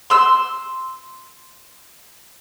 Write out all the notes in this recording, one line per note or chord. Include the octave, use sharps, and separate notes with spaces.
C6 E6